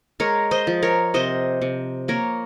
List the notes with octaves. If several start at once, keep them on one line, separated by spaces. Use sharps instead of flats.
G#3 A#4 C#5
C5 D#5
F3
A#4 C#5
C3 C5 D#5
C3
A#3 A#4 C#5